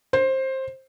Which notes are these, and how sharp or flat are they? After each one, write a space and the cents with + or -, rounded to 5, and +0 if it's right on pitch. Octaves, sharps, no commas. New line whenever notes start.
C5 +15